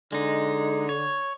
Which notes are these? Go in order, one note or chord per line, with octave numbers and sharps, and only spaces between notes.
D3 G#3 D#4
C#5